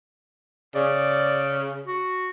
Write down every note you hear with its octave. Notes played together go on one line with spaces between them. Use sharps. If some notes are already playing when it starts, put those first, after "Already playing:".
C#3 D5
F#4